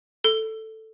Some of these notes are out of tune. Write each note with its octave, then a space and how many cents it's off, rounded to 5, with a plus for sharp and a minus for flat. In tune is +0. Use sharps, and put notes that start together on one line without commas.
A4 +5